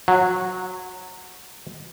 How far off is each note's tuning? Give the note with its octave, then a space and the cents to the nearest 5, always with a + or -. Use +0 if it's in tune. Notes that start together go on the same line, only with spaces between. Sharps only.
F#3 -10